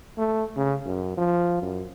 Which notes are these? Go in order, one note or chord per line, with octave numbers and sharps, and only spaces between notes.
A3
C#3
F#2
F3
F#2